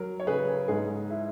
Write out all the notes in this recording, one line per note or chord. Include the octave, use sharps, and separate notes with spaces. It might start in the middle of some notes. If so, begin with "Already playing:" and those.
Already playing: F#3 A#4
C#5
C#3 G#4 B4
G#2 G#4
E4